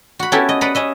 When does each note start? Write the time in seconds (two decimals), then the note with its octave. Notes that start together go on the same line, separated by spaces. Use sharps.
0.19 F#4 B5
0.32 B3 C#4 E4 G4 A4 A#4
0.49 D#5
0.61 B4 D5 D#5 F#5 A#5 B5
0.75 C#4 D#5 E5